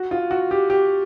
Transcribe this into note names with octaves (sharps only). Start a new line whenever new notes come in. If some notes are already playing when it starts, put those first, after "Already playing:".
Already playing: F#4
F4
F#4
G4
G4